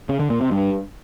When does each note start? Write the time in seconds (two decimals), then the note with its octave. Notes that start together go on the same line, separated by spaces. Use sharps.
0.09 C#3
0.20 D3
0.30 A#2
0.41 C3
0.51 G2